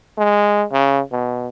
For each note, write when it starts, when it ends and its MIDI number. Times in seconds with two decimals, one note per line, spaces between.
0.18 0.64 56
0.72 1.01 49
1.12 1.48 47